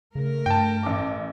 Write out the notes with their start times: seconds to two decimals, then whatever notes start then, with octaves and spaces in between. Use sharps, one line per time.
0.15 C#3 A3 A#4
0.46 G2 G5 A5
0.83 A1 D6